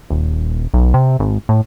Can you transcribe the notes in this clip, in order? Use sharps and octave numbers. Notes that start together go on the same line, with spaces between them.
D#1
B1
C3
G#1
A2